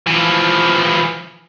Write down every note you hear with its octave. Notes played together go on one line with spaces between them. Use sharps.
E3 F3